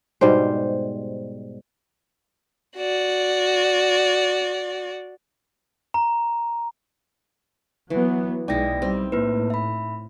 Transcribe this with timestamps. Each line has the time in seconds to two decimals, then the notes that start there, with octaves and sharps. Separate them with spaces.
0.21 G#2 B2 G3 C5
2.77 F#4 D5
5.94 A#5
7.90 E3 F#3 B3
8.48 B1 G#3 D#4 E4 D5 G5 A#6
8.82 G3 C4
9.12 A2 A#3 E4 B4
9.50 E5 B5